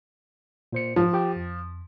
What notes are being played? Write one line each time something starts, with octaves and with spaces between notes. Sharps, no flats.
A#2 C5 C#7
G#2 F3
F4 G4 G5
F2